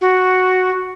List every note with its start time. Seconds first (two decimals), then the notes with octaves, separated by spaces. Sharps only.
0.01 F#4